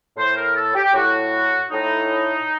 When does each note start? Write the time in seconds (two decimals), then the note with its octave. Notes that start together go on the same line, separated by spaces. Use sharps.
0.17 A2 C5
0.36 A#4
0.55 A4
0.75 G4
0.94 A2 F#4
1.72 A2 D#4